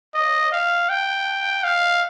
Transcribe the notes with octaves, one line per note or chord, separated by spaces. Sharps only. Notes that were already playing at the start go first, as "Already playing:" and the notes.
D#5
F5
G5
F5